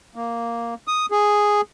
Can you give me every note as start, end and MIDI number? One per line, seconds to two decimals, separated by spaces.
0.15 0.74 58
0.88 1.06 87
1.11 1.61 68